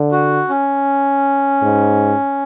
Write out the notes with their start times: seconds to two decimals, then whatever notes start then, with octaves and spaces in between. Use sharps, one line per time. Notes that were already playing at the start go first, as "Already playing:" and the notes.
Already playing: D3
0.12 F#4
0.49 C#4
1.62 G#2